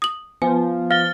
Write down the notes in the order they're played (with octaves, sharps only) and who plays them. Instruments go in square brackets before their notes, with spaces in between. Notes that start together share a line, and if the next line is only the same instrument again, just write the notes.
[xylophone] D#6 F#7
[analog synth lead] F3 [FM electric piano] B3 [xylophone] G#5
[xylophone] F5 [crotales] F6 A6 G7